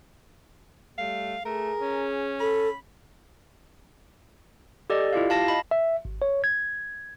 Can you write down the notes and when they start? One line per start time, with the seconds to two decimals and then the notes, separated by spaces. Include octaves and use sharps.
0.98 G3 A3 F5
1.45 A3 G#4 A#4
1.80 C#4
2.40 A4 B5
4.90 G4 A4 D5 D#5
5.13 E4 F4 G4 F5
5.30 F5 A5 A#6
5.48 D#5 B5
5.71 E5
6.05 G#1
6.22 C#5
6.44 G#6